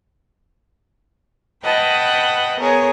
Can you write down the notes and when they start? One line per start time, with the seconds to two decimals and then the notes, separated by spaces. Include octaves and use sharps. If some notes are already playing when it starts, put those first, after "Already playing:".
1.63 B4 D#5 F#5 G5 A5
2.58 B3 G#4 A#4 C#5